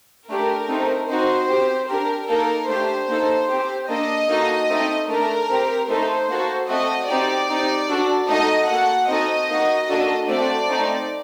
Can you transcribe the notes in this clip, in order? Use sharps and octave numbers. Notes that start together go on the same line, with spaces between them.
A3 D4 G4 A#4
A3 C4 D#4
C4 D#4 F#4 C5
C4 G4
D4 G4 A#4
A#3 D#4 A4 A#4
A3 D4 G4 C5
A#3 D#4 A4
C4 G4
A#3 D4 A4 D#5
A#3 D#4 F#4 A4
A3 C4 D#4 A4
A3 D4 A4 A#4
C4 G4
A3 D#4 A4 C5
A#3 F#4 A4
A3 C4 F#4 A4 D#5
C4 D#4 G4 D5
C4 D#4 G4
D4 F#4 A4
A3 D#4 F#4 A4 D#5
A#3 F#4 A4 F#5
C4 D#4 F#4 A4 D#5
A#3 D#4 F#4
A#3 D4 F#4 A4
A3 C4 F#4 A4 D5
A3 C4 D#4